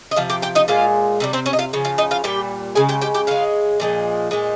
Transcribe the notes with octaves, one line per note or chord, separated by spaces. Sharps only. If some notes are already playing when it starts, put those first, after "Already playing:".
D#5
C3 F3 F5
G4 G5
G4 G5
D#4 D#5
A#2 G#3 F4 F5
C3 D#3 G3
C4 C5
C#4 C#5
D#5
F4 F5
C#3 F3
F4 F5
D#4 D#5
F4 F5
A#2 G3 G4 G5
C#3 G#3 G#4 G#5
G4 G5
G4 G5
G4 G5
C#3 G#3 F4 F5
A#2 F3 G#3
A#2 G#3